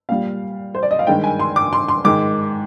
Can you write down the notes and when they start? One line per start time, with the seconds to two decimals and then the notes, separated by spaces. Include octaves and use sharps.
0.09 A#2 G3 F5
0.75 C5
0.83 D5
0.91 D#5
0.99 F5
1.07 G2 D#3 G#3 G5
1.24 G#5
1.39 C6
1.56 D6
1.73 C6
1.88 C6
2.05 G#2 D#3 G#3 D6